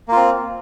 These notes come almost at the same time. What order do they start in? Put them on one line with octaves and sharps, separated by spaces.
A#3 F4 C4